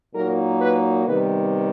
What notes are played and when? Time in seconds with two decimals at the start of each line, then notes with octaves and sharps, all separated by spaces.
0.14 A#2 F#3 A#3 D#4 A#4
0.60 B4
1.06 C3 D#3 G3 B3 B4